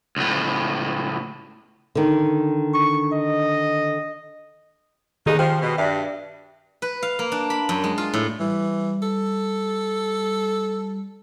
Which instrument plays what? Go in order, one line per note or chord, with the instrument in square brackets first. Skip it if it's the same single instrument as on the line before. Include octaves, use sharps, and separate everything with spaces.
[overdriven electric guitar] C#2 A2
[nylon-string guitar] D3 D#3
[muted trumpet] C#6
D#5
[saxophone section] D#2 B3 D#4 [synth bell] D#3 G4 G#4
[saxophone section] F3 [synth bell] G5
[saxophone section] B2
[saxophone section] G2 [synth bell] E5
[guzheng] B4
F5
A#3
D4
B5
F#2
G#3
F4
A2
[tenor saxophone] E3 [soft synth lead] G3
[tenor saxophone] A4